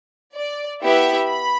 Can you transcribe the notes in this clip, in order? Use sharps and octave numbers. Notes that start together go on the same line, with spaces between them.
D5
B3 E4 G4 E5
B5